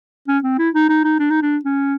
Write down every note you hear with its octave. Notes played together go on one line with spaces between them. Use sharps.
C#4
C4
E4
D#4
D#4
D#4
D4
D#4
D4
C#4